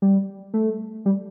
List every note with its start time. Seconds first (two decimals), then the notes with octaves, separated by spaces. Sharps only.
0.02 G3
0.54 A3
1.06 G3